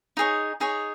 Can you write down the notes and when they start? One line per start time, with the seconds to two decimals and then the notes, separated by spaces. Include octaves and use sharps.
0.17 D#4 G#4 C#5
0.60 D#4 G#4 C#5